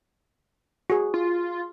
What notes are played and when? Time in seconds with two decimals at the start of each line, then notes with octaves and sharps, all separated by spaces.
0.90 F#4 G#4
1.14 F4